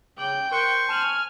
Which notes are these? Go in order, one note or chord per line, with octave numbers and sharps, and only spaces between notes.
C#3 G5 D6 F#7
A#4 C5 C#6 F#6 C#7
G#5 A5 F6 E7 F#7